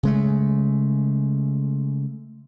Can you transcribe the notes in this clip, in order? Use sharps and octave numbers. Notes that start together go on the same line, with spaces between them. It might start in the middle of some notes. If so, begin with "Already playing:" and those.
C#3 G#3 A3